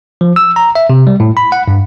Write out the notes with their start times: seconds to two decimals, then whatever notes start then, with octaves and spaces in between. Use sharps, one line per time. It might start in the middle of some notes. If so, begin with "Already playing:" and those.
0.21 F3
0.36 E6
0.56 A#5
0.75 E5
0.90 C3
1.07 G3
1.20 A2
1.37 B5
1.52 F#5
1.68 G2